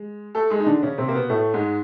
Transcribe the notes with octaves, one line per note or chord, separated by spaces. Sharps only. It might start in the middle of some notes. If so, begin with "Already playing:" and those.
Already playing: G#3
A3 A4
G#3 G#4
D#4
D3 D4
C#3 C#4
C3 C4
A#3
B2 B3
A2 A3
G#2 G#3